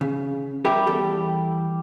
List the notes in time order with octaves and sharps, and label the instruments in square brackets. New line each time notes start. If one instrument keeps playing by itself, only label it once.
[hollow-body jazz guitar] C#3
[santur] G3 [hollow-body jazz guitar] G4 A#4 E5
[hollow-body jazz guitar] E2 A4 G5